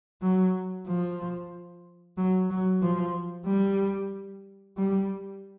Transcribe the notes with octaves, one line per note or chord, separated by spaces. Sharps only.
F#3
F3
F#3
F#3
F3
G3
G3